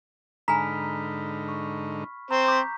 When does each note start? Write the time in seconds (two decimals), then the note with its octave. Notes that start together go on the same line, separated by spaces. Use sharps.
0.48 G#2 D3 D#4 G#5 A#5 B5 F6 B6
1.48 C#6
2.31 C4 C5 A#5 C#6
2.48 D6 G6 B6